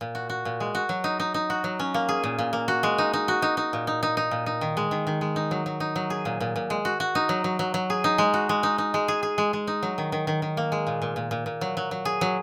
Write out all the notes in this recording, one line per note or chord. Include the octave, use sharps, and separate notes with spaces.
A#2
F#4
F#4
A#2
G#3
F#4
F#3
D#4
D#4
D#4
F#4
F#3
C#4
A#3
G#4
A#2
A#2
A#3
F#4
G#3
D#4
D#4
F#4
D#4
D#4
A#2
D#4
D#4
D#4
A#2
D#4
D#3
G#3
D#3
D#3
G#3
D#4
F#3
F#3
D#4
F#3
G#4
A#2
A#2
A#2
G#3
F#4
F#4
D#4
F#3
F#3
F#3
F#3
G#4
D#4
G#3
F#4
G#3
D#4
D#4
G#3
G#4
G#4
G#3
G#3
D#4
F#3
D#3
D#3
D#3
D#3
A#3
G#3
A#2
A#2
A#2
A#2
A#2
F#3
F#3
F#3
G#4
F#3